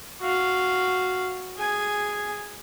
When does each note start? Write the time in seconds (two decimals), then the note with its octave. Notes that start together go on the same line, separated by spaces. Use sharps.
0.21 F#4 F5
1.58 G#4 G#5